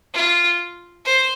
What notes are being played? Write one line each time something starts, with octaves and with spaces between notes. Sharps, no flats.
F4
C5